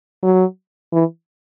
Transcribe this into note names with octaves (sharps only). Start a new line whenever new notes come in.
F#3
E3